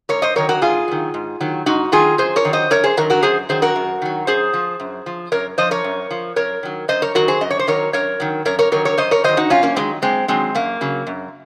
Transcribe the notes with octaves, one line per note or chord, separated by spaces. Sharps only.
G#2 A#4 C#5
C5 D#5
D#3 F#3 A#4 C#5
F#4 A#4
G#2 F4 G#4
D#3 F#3
G#2
D#3 F#3
G#2 D#4 F#4
D#3 F#3 F4 G#4
F#2 G#4 C5
A#4 C#5
D#3 F#3
C5 D#5
F#2 A#4 C#5
G#4 C5
D#3 F#3 F#4 A#4
F#4 A#4
F#2 G#4 C5
D#3 F#3 G#4 C5
F#4 A#4
F#2
D#3 F#3
F#2 G#4 C5
F3
F#2
F3
F#2 A#4 C#5
F3 C5 D#5
A#4 C#5
F#2
F3
F#2 A#4 C#5
D#3 F#3
F#2 C5 D#5
A#4 C#5
D#3 F#3 F#4 A#4
G#4 C5
F#2 D#5
C#5
C5
D#3 F#3 A#4 C#5
F#2 A#4 C#5
D#3 F#3
F#2 A#4 C#5
A#4 C#5
D#3 F#3 A#4 C#5
A#4 C#5
F#2 C5 D#5
A#4 C#5
D#3 F#3 C5 D#5
D#4 F#4
F#2 C#4 F4
A#3 C#4
D#3 F#3 G#3 C4
F#2 G#3 C4
D#3 F#3 G#3 C4
F#2 A#3
C#3 F#3
F#2